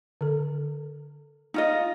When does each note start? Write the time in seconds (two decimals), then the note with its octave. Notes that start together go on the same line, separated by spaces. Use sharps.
0.21 D3 A4
1.54 D#4 F4 D#5